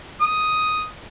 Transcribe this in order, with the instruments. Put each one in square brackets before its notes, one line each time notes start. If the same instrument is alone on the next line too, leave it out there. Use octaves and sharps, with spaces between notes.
[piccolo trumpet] D#6